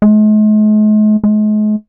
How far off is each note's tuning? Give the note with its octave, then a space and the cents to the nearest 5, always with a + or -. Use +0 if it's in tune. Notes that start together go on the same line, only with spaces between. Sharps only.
G#3 +45
G#3 +40